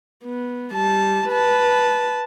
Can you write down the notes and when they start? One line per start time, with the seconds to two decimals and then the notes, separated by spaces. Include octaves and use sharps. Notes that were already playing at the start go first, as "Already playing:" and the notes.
0.24 B3
0.73 G3 A5
1.28 B4 A5